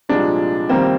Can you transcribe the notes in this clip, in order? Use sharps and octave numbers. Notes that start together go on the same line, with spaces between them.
C2 A#2 F3 G#3 D4
F2 C3 D#3 G3 A#3 C4